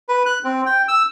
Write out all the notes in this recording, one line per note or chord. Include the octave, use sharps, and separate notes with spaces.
B4
F#6
C4
G5
E6